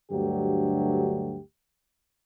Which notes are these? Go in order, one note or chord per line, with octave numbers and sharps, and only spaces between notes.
D2 G2 D3 F#3 A3 G4